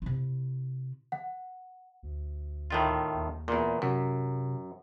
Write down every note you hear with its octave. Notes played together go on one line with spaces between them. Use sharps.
C3 E4
F#5
D2
A2 D#3 F4
D#2
E2 A#2
F#2 C3